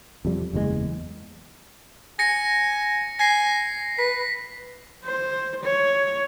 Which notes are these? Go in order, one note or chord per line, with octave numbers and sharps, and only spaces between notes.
F2 C3 G3
F#1 E2 A#2 G#3
G#5 A#6 C#7
G#5 A#6 C7
B4 B6
C5
C#5